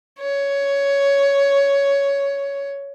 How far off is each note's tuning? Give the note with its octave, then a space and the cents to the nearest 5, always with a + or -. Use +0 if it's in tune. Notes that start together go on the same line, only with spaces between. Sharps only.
C#5 +10